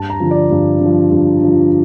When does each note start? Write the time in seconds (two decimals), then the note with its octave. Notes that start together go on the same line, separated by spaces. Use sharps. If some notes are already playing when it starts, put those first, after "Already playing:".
Already playing: G2 A5
0.10 A#5
0.20 D3 F3
0.31 D5
0.50 G2
0.80 D3
0.86 F3
1.11 G2
1.41 D3 F3